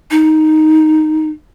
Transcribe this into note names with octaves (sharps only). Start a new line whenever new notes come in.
D#4